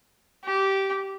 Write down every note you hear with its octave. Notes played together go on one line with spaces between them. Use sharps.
G4